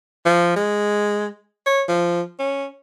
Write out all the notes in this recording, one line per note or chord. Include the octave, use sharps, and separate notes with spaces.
F3
G#3
C#5
F3
C#4